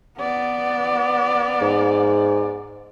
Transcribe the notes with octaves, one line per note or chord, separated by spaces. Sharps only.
B3 D5
G#2